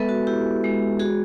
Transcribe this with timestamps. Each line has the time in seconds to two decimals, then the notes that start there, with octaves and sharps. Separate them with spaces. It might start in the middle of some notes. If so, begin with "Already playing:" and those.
Already playing: G#3 B3 A4 B4 E5
0.09 F#4
0.27 E4 G4
0.64 G#3
0.99 F#4 G#4